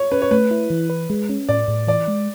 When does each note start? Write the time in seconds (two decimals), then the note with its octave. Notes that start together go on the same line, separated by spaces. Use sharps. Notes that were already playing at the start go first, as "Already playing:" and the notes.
Already playing: C#5
0.12 C#4 B4
0.22 C#5
0.31 A3 B4
0.51 E4
0.70 E3
0.90 B4
1.10 G#3
1.29 C#4
1.49 A2 D5
1.68 A2
1.87 E3 D5
2.08 G#3